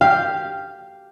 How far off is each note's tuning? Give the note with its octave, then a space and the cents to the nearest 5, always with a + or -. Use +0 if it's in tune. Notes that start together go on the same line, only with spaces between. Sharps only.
G4 +0 F5 -10